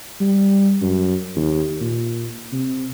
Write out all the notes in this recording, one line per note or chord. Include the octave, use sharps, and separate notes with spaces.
G3
F#2
D#2
A#2
C3